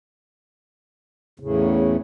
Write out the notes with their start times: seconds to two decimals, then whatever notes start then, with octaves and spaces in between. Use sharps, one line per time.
1.40 E2 A2 C#3